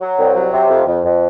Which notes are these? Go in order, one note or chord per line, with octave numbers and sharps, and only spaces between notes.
F#3
C2
F#3
C3
F2
F2
F2